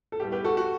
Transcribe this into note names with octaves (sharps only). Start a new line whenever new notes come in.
A4
A2 G3 B3 G4
G4 B4
F#4 A4
F#4